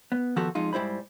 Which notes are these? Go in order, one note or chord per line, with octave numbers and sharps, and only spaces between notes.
B3
D#3 F3 B3 F#4 G4 A4
F2 G#3 D#4 F4
G#2 G3 E4 C5 B5